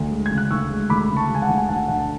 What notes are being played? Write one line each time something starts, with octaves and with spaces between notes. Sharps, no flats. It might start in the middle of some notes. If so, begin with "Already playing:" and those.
Already playing: D2
G#3
G#6
C#3
F#6
D2 C#6 E6
G#3
D2 B5 D6
C#3
A5 C#6
G#3
G#5
F#5 A5
D2
G#5
D2 F#5 A5
D3 F#5 A5
A5